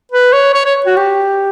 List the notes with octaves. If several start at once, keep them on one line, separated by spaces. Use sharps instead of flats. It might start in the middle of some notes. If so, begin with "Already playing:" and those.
B4
C#5
C#5
C#5
F#4
G4